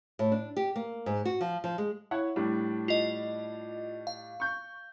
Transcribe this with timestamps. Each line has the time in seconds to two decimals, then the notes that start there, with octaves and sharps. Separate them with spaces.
0.19 A2
0.32 D4
0.57 G4
0.76 A#3
1.06 G#2
1.25 F#4
1.41 F3
1.64 F3
1.78 G#3
2.11 E4 C#5 F#5
2.36 A2 G3 D4
2.88 F4 D#5
4.07 F5
4.40 C#6 G6